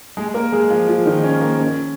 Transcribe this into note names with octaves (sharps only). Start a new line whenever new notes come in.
G#3 G#4
A#3 A#4
G#3 G#4
F3 F4
F3 F4
D#3 D#4
C#4
A#3
C#4